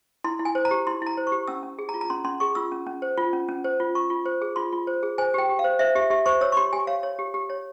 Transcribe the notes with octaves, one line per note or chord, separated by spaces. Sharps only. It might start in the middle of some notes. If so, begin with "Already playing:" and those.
E4 C6
E4
G#5
C5
A#5
G4
E4 C6
E4 A#5
C5
C#6
G4
C#4 E6
C#4
G#4
A#5
F4
A#5
C#4 C6
C#4 C6
G#4 C#6
F4 E6
C#4
C#4
C5
F4
C#4
C#4
C5
F4
F4 C#6
F4
C5
G#4
F4 C6
F4
C5
G#4
C5 G#5
G4 G5
G4
F5
C5
C5 E5
G4 E5
G4 E5
C5 C#6
C#5 E6
C#6
G4 C6
G4 G#5
C#5 F5
C#5
G4
G4
C#5